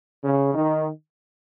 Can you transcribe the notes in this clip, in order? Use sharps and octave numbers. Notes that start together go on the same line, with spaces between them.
C#3
D#3